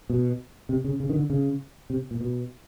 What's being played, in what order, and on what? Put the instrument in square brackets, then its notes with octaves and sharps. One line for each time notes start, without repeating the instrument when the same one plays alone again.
[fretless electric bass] B2
C3
C#3
C#3
D#3
D3
C#3
C3
A#2
B2